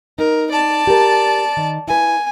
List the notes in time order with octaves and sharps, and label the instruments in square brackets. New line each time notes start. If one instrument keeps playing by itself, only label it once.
[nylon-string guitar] D#4 [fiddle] A#4
[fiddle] D5 A5
[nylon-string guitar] G4 A#4
D#3
[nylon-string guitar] E4 B4 [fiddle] G#5